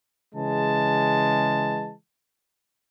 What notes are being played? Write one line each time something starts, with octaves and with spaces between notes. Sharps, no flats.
C#3 E3 G#3 A5